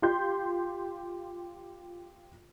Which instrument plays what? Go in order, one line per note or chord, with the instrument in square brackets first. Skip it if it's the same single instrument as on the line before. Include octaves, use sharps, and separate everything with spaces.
[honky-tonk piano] F4 G4 C6 G6